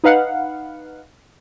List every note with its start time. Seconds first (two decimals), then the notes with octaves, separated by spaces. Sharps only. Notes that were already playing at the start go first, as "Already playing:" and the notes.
0.04 D#4 B4 F5 F#5